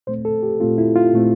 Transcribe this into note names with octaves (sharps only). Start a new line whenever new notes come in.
A#2 A3 C4 C5
A4
G4
A#2 A3 C4 F4
E4
F4
A#2 A3 C4